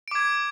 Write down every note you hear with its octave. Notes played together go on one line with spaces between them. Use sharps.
D6 G#6 D7